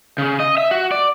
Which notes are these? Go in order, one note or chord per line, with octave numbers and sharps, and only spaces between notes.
C#3
D#5
E5
F#4
D5